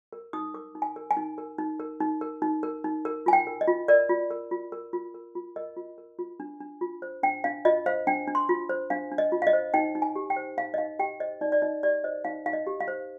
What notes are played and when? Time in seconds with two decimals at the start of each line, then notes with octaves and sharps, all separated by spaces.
0.13 A#4
0.33 D#4 D#6
0.54 A#4 D6
0.75 D#4
0.82 G#5
0.96 A#4
1.11 G#5
1.17 D#4
1.38 A#4
1.58 D#4
1.80 A#4
2.00 D#4
2.21 A#4
2.42 D#4
2.63 A#4
2.84 D#4
3.05 A#4
3.26 F4 G#5
3.33 G5
3.47 A#4
3.61 D#5
3.68 F4
3.88 A#4 D5
4.09 F4
4.31 A#4
4.51 F4
4.72 A#4
4.93 F4
5.14 A#4
5.35 F4
5.56 A#4 D#5
5.76 F4
5.98 A#4
6.19 F4
6.40 D4
6.60 D4
6.81 F4
7.02 C5
7.23 D4 G5
7.44 D4 F5
7.65 F4 D#5
7.86 C5 F5
8.07 D4 G5
8.28 D4
8.35 C6
8.49 F4
8.69 C5
8.90 D4 F5
9.12 D4
9.18 D#5
9.32 F4
9.42 F5
9.47 D#5
9.53 C5
9.74 D#4 G5
9.95 D#4
10.02 G#5
10.15 G4
10.30 G5
10.36 C5
10.57 D#4 F5
10.74 D#5
10.78 D#4 F5
10.99 G4 G5
11.20 C5 D#5
11.41 D#4 D5
11.52 D5
11.62 D#4 D#5
11.83 G4 D5
12.04 C5 D#5
12.25 D#4 F5
12.46 D#4 F5
12.53 D#5
12.67 G4
12.80 F5
12.88 C5